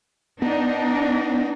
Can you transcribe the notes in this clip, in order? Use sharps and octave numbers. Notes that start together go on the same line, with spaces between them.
B3 D4 D#4